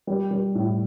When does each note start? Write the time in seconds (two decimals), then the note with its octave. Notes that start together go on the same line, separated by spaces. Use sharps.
0.07 G3
0.31 G3
0.55 A2